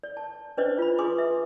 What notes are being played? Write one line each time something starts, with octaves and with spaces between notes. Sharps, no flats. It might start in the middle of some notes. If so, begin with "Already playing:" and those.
D5
A5
C#4 D4 B4 C5 D5 D#5
F4 B5
G#4 B4 G#5 C6 D6 D#6
E5